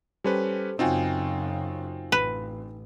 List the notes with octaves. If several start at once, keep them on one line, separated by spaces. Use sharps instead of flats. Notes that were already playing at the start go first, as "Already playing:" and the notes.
G3 C#4 G4 A4 B4 C5
F#2 C#3 C4 D#4 F4 F#4 G5 G#5
A1 B4